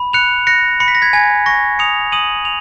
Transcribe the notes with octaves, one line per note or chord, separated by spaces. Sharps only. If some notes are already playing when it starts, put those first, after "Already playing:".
Already playing: B5
F#6 C#7 F7
F#6 A#6 C#7
B5 C#7
B6
A#6
G#6 B6
G#5 G#6
C#6 A#6
D#6 C#7 F7
D#6 D#7 F#7
F7